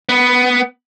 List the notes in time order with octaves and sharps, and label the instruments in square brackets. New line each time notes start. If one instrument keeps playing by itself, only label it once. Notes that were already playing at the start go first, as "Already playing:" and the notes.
[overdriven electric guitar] B3